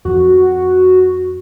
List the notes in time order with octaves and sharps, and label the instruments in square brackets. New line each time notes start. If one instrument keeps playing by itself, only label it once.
[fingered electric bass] F2 F3 [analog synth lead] F#4